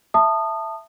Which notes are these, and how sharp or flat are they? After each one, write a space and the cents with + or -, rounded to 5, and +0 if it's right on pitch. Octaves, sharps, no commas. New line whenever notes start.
E5 +10 A5 +15 D#6 -20